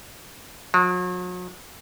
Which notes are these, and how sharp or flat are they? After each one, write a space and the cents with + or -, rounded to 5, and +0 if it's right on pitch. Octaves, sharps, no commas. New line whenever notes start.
F#3 -40